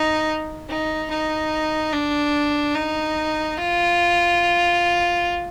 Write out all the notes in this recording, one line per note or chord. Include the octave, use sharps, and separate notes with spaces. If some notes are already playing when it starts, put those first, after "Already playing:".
Already playing: D#4
D#4
D#4
D4
D#4
F4